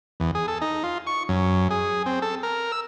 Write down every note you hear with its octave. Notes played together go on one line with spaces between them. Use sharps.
E2
G#4
A4
D#4
F4
C#6
F#2
G#4
C4
A4
A#4
E6